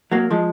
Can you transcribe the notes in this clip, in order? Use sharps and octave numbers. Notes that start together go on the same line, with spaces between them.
F#3 A#3
F3 G#3